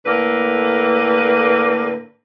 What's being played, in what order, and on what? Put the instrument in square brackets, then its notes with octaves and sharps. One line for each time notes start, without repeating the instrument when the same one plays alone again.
[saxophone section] A2 D3 A#3 B4